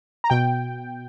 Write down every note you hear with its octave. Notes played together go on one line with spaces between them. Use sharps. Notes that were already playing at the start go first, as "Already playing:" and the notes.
A#5
B2 G5